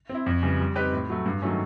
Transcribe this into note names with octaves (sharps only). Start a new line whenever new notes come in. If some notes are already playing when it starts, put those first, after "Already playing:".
C4
E4
F2
C#3 E3 G3
G3
C4 D#4 G4 B4
A2
F#3 A3
G2
D#3 F#3 A3 C#4